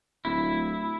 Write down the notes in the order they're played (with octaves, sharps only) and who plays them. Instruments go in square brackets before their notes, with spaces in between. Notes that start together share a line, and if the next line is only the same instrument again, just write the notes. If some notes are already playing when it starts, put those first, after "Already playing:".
[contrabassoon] D1 [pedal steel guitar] E4